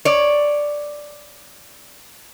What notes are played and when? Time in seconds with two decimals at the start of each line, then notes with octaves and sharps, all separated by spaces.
0.05 C#5 D5